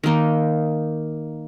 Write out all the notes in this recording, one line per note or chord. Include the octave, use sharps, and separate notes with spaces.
D#3 A#3 D#4